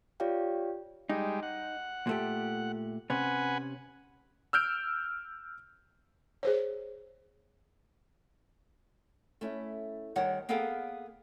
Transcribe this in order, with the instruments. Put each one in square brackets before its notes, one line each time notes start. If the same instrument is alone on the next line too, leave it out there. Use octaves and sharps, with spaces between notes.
[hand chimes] F4 G4 C#5 D5 F5 G5
[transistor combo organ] G3 G#3 [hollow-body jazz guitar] D#4
[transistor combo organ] F#5
[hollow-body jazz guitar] A#2 A3 G4
[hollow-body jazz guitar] C3 C#4 [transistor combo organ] B4 F#5 G#5
[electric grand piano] E6 F6 G6 D7
[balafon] G#4 C5 C#5
[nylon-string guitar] A3 C#4 E4
D#2 D#3 G3 C#5 F#5
A#3 B3 G#4 A4 F5 G5